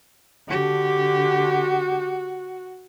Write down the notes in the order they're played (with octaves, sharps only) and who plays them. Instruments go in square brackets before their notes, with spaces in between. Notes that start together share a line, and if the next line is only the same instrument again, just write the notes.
[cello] D3 G4 [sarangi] F#4